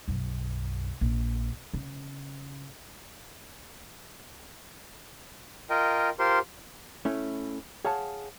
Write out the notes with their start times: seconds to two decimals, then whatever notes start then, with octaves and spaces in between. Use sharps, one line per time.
0.08 B1 F#2
1.01 A#1
1.74 C#3
5.70 F4 A#4 D#5 G5
6.19 F4 G4 A#4 C5 C6
7.05 A3 C#4 E4
7.85 G#4 C#5 F5 F#5 A5